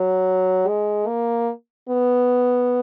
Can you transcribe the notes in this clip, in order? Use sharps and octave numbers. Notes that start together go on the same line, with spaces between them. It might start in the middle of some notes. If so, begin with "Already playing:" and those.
Already playing: F#3
G#3
A#3
B3